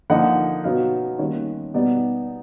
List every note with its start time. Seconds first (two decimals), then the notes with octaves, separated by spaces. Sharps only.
0.10 D3 F3 A#3 D#4 F#5
0.64 B2 F#3 B3 D#4 F5
1.19 D#3 G3 A#3 C#4 C#5
1.74 B2 G3 B3 D#4 D5